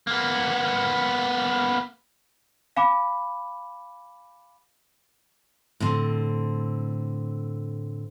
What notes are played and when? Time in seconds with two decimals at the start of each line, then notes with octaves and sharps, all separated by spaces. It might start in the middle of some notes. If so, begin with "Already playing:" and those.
0.07 A#3 B3
2.77 F5 G#5 B5 D6
5.80 A2 D3 C4